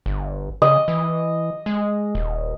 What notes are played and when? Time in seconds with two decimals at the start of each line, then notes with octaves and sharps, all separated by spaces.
0.06 G1
0.62 C#3 D#5
0.88 E3
1.66 G#3
2.15 D#1